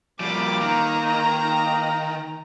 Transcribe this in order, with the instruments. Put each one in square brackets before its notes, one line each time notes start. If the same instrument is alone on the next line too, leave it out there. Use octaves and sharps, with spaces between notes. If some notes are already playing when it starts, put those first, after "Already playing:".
[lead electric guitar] F3 G3 [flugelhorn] A#3 [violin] D6
[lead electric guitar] D#3 [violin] A#5